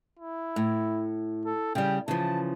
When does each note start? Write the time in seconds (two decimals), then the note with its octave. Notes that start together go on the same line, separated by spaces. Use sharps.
0.19 E4
0.56 A2
1.45 A4
1.75 C#3 G3 G5
2.08 C#3 E3 F3 A5